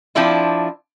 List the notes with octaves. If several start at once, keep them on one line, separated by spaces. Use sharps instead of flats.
F3 C4 D4 E4 F4